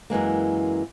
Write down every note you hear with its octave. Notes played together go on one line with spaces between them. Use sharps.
F#2 E3 G#3 A#3